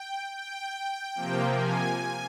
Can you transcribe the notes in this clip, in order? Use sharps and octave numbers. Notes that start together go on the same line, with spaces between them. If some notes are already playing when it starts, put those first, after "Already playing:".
Already playing: G5
G5
C3 F3 A#3
G#5